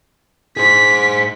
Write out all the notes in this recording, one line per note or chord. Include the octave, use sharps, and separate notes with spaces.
G#4 C5 B6